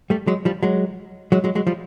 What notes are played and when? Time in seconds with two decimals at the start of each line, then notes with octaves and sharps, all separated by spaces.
0.10 G3 A3
0.27 F#3 G#3
0.45 F3 G3
0.63 F#3 G#3
1.32 F#3 G#3
1.44 F#3 G#3
1.55 F#3 G#3
1.67 F3 G3